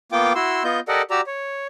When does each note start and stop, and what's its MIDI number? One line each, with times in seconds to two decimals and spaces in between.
0.12 0.33 58
0.12 0.33 59
0.12 0.33 65
0.12 0.33 79
0.12 0.33 86
0.35 0.63 64
0.35 0.63 66
0.35 0.63 84
0.35 0.63 88
0.64 0.80 59
0.64 0.80 65
0.64 0.80 75
0.64 0.80 91
0.88 1.02 67
0.88 1.02 69
0.88 1.02 70
0.88 1.02 74
0.88 1.02 75
0.88 1.02 78
1.11 1.21 66
1.11 1.21 67
1.11 1.21 74
1.11 1.21 82
1.11 1.21 88
1.27 1.67 73